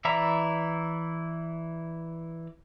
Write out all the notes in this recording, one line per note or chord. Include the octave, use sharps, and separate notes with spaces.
E3 E4 D5 E5 A#5